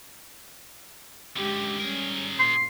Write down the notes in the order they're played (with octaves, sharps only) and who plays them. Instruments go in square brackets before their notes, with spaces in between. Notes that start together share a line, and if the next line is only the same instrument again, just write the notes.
[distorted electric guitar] F#2 D3 [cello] G#3 G4
[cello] G3 C#4 [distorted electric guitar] G#4 A#4
[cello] A#2 [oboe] C6